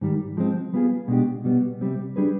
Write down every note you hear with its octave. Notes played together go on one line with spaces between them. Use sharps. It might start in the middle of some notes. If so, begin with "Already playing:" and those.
G#2 D#3 G3
F3 G#3 C4
G3 B3 F4 G#4
B2 G#3 D4 G4
B2 G3 B3
C3 G3 C4
G3 D4 G#4 B4